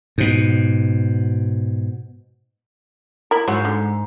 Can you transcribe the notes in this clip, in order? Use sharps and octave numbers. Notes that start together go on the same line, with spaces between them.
G#2 B2
E4 A#4
G#2 F#3 F4 F#4
D3